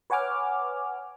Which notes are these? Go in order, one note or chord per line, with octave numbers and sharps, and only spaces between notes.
B4 C#5 F#5 G#5 D6 F6